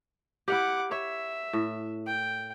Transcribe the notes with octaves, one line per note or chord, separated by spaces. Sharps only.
E4 G4 F#5 D6
C#5 E5
A2
G5